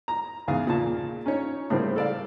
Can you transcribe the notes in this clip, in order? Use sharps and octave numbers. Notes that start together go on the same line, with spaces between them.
A#5
E2 G#2 C#3 G#4 F5
A#2 C#3 A5
C#4 D#4 C#5
A2 C#3 G3 A#3 C4
A4 D5 F5